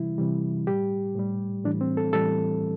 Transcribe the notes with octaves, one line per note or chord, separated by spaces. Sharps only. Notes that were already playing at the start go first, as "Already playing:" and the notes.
Already playing: C3 E3 G3 E4
C3 E3 G3
A2 G3 G4
A2 G3
A2 E3 G3 D4
C4
A4
A2 E3 G3 A4